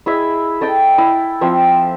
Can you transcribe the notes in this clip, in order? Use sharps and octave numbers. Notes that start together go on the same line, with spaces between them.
E4 G#4 D#5 E5
A4 D#5 G5 A5
E4
F3 C4 E5